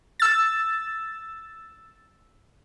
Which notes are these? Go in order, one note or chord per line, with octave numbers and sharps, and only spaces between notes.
E6 A6